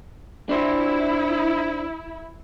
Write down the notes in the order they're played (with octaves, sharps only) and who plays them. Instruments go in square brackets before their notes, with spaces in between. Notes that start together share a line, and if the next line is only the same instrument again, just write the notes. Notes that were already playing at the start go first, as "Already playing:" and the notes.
[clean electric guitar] D4 C5 [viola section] E4